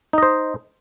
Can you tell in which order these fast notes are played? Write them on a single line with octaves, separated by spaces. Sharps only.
D#4 D#5 C5